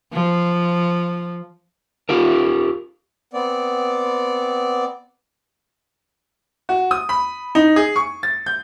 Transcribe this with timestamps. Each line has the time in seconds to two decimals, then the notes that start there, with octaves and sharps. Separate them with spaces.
0.13 F3
2.09 F4 G4 A#4
3.33 B3 C4 D5
6.69 F#4
6.91 D#6
7.09 B5
7.55 D#4
7.76 G#4
7.96 C#6
8.23 A6
8.46 G6